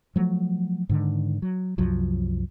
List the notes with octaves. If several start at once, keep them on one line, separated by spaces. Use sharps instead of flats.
F3 F#3 A3
G#2 D3 D#3
F#3
C2 F#2 F3 F#3